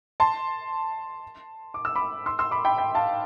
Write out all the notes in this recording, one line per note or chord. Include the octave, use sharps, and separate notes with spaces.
A5 C6
D6
E6
B5 D6
C6 E6
C6 E6
B5 D6
G5 B5
G5 B5
F5 A5